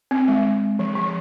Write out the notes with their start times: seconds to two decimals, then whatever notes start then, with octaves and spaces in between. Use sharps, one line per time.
0.11 C4
0.28 G#3
0.79 F3
0.95 F3